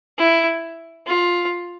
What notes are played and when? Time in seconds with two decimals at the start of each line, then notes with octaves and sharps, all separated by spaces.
0.18 E4
1.07 F4